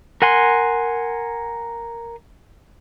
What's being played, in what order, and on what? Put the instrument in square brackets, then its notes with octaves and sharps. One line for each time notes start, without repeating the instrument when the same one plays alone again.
[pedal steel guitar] A#4 F#5 G#5 C6